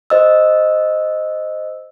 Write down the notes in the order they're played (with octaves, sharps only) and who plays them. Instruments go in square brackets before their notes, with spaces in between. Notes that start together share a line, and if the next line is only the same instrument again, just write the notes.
[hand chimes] C5 D#5 E6